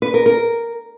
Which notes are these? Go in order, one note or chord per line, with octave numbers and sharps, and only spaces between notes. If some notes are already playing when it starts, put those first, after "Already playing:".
B4
A#4
A#4